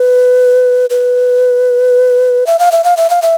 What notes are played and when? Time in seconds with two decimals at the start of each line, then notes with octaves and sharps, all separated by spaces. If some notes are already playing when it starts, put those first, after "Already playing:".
Already playing: B4
0.90 B4
2.47 E5
2.59 F5
2.72 E5
2.84 F5
2.97 E5
3.10 F5
3.22 E5